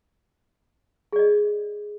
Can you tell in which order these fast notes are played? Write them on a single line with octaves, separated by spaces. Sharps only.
G#4 D5 D#5